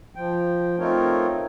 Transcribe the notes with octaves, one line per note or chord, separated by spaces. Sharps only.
F3 G5
A3 C4 D#4 F4 A#4 C#5